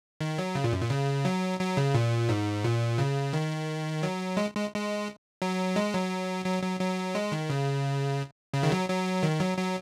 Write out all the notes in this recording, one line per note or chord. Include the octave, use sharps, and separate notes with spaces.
D#3
F#3
C#3
A#2
F#2
A#2
C#3
F#3
F#3
C#3
A#2
G#2
A#2
C#3
D#3
F#3
G#3
G#3
G#3
F#3
G#3
F#3
F#3
F#3
F#3
G#3
D#3
C#3
C#3
D#3
F#3
F#3
D#3
F#3
F#3